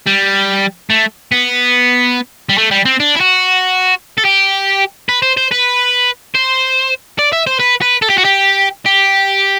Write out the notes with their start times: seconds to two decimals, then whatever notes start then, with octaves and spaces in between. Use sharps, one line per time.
0.07 G3
0.90 A3
1.32 B3
2.49 G3
2.58 A3
2.71 G3
2.85 C4
3.00 D4
3.15 E4
3.20 F#4
4.18 A4
4.25 G4
5.09 B4
5.22 C5
5.37 C5
5.51 B4
6.35 C5
7.19 D5
7.33 E5
7.47 C5
7.60 B4
7.82 B4
8.02 A4
8.10 G4
8.18 F#4
8.25 G4
8.86 G4